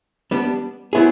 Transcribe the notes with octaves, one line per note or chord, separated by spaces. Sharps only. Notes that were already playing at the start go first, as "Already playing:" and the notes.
G3 B3 D4
F#3 B3 E4 G#4